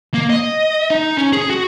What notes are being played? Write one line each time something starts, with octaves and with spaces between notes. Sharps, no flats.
A#3
D#5
D#4
C#4
G#4
F#4